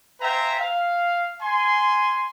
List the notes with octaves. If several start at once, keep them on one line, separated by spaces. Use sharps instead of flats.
C5 E5 F5 G5 G#5 A#5
F5
G#5 C6